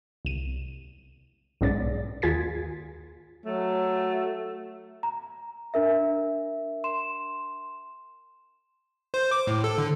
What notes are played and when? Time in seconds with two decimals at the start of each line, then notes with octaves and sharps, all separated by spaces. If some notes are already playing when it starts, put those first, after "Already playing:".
0.25 C2 D#7
1.61 B1 G#2 B3 C#4 D5 A6
2.22 D#2 F4 G#4 G#6 A6 B6
3.45 F#3 A3
5.03 A#5
5.74 D4 A#4 E5
6.84 C6 E7
9.14 C5
9.31 D6
9.47 A2
9.64 A4
9.78 D3